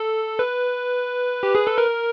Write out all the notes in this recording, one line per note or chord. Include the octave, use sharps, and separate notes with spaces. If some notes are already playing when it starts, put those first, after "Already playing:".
Already playing: A4
B4
G4
G#4
A4
A#4